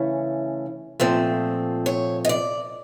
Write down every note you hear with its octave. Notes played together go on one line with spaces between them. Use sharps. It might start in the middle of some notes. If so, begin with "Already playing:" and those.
Already playing: C#3 E3 A3 C#4
A#2 F3 A3 C4
C#5
D#5
D5